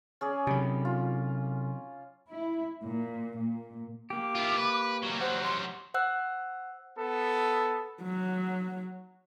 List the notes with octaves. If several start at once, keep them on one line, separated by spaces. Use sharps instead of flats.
C#4 G#4 D5
C3 F#3 G3
F4
E4
A#2
A#2
A#3 G4 D6
E4 F4
B4
F#3 G3
C5 F#5
C6
C5 F#5 E6 F#6
B3 A4
F#3